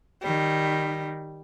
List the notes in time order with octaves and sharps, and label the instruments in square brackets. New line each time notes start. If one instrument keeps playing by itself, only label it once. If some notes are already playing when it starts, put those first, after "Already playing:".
[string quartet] D#3 G3